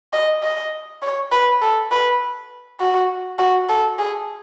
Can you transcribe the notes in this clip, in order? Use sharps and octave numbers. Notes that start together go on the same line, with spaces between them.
D#5
D#5
C#5
B4
A4
B4
F#4
F#4
A4
G#4